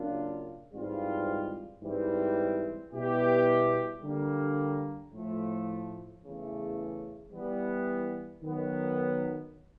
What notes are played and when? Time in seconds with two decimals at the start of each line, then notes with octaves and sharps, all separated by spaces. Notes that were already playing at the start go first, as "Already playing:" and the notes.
Already playing: C#3 F#3 A#3 D4 F4
0.73 G#2 E3 G3 C4 F4
1.82 G#2 E3 G3 C4
2.92 B2 G3 B3 E4 G4
4.02 D3 G3 A#3
5.12 A2 F3 A3
6.21 E2 C#3 E3 A3
7.32 E3 G3 B3
8.43 D#3 F#3 B3